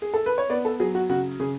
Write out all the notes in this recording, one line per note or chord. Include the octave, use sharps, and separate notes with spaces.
G#4
A4
B4
C#5
B3 D5
A4
F#3 G#4
F#4
C#3 F#4
C#3 G#4